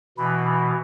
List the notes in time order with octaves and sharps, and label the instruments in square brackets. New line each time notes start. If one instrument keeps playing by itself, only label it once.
[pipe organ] B2 E3 [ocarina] B5